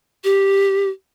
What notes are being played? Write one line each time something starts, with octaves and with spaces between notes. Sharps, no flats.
G4